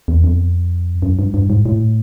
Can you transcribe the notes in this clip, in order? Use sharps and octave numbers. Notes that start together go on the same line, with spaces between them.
E2
F2
F#2
G2
G2
G#2
A2